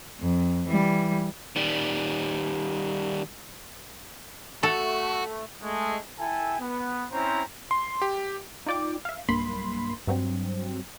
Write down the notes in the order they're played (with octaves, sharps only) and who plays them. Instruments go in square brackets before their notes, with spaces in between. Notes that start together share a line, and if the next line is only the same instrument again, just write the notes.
[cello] F2
E3 G3
[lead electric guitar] D#3 G3
[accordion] A3 [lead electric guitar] F#4 [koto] A4
[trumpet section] G#3 A3
E4 A4 G5 G#5
B3
C4 C#4 E4 C5 A#5
[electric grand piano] C6
G4
[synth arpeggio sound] D#4 F4 D5 G5 D6
E5 F5
B1 G2 A#3 B5 C6
G2 F#3 C4